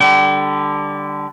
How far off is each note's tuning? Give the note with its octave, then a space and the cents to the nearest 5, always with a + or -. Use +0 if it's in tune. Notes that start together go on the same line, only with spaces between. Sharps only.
D3 +0 G3 +0 G5 -45